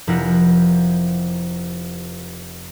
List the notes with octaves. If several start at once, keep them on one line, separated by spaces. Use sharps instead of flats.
F1 F3 B3 E4 A#4 F#5